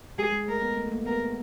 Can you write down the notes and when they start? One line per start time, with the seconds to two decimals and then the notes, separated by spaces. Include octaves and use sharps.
0.18 G#3 G#4
0.32 G#3
0.48 A3 A#4
0.62 B3
0.77 A3
0.87 A3
0.92 A#3
1.06 B3 A#4